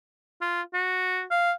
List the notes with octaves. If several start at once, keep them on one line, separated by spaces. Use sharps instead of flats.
F4
F#4
F5